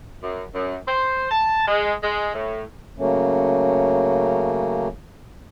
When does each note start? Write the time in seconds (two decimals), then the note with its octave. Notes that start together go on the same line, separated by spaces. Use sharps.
0.22 F#2
0.54 F#2
0.88 C5
1.30 A5
1.67 G#3
2.03 G#3
2.34 A2
2.99 C#3 F#3 A3 A#3 C#4